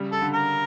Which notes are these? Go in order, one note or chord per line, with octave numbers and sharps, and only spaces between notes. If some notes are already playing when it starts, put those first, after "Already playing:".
Already playing: C#3 G3
A4
D3
A#4